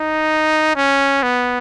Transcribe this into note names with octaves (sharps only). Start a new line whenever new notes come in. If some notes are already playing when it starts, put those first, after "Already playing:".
Already playing: D#4
C#4
B3